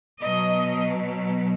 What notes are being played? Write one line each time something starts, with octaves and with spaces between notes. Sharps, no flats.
B2 F#3 D#5